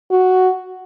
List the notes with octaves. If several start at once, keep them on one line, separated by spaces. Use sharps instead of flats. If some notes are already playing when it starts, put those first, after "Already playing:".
F#4